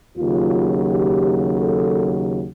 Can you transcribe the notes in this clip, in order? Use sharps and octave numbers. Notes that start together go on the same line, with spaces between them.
D#2 C#3 F#3 F4
G4
A4